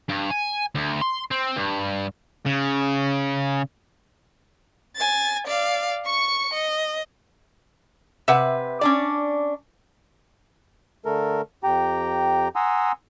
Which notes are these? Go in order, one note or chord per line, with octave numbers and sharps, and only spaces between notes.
G2
G#5
D2
C6
C4
G2
C#3
G#5 A6
D5 F5
C#6 C#7
D#5
C3 B4 E5 F#5
C#4 D4 D5
D3 A3 A4 A#4
F2 G4 G5 A#5
F#5 G#5 A#5 C6 D#6 E6